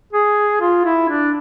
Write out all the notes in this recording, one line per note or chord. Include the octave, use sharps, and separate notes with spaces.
G#4
F4
E4
D4